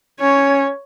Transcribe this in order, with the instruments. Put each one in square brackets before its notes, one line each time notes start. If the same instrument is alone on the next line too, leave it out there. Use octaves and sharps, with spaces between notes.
[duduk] C#4 [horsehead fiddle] C#5